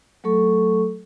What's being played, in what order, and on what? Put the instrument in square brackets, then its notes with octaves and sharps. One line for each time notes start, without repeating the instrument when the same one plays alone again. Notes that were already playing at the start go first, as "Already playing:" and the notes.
[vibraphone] F#3 A3 A4 C#6